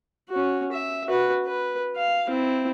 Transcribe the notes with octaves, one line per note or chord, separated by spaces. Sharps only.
C#4 F#4
E5
F#4 B4
B4
F5
C4 E4